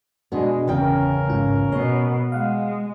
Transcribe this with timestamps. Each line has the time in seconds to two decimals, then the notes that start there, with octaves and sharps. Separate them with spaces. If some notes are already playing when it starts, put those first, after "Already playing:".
0.32 B2 G#3 B3 D4 F#4
0.67 G1 E2 C#3 C#4 A#4 G5
1.27 A1 G#2 F4
1.72 B2 C#5 D#5
2.32 G#3 F5 F#5